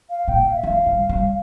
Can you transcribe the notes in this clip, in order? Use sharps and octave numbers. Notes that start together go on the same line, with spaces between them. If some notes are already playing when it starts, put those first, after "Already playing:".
F5
A#2 G5
F5
E5
F3
F5
G3
G3